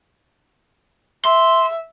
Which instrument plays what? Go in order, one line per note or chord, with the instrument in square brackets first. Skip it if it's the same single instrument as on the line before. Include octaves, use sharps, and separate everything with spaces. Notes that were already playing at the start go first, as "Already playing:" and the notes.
[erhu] E5 [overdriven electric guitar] C6